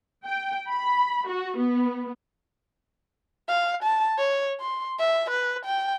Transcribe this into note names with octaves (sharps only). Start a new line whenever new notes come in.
G5
B5
F#4
B3
F5
A5
C#5
C6
E5
B4
G5